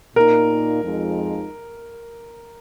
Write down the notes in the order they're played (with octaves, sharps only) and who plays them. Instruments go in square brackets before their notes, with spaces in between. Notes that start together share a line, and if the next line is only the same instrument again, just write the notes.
[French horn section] A#2 A#3 D#4 [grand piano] A#4
[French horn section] F2 F3 G#3 D#4